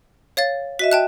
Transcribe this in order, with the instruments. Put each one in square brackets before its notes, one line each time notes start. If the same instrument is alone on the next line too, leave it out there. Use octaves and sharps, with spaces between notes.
[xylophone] C#5 F5 A6
[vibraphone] F#4 D#5 E5 [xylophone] B6
[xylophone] G5 A5 F#6